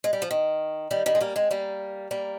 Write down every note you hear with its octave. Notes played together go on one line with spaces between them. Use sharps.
G#3
G3
F3
D#3
D#3 G3
D#3 G3
G#3
G3 A#3
G#3 C4
G3 A#3
G3 A#3